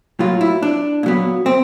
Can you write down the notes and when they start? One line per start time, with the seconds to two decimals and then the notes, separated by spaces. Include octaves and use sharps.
0.19 A2 F#3 A#3 F4
0.41 E4
0.62 D4
1.03 A#2 F#3 B3
1.46 C4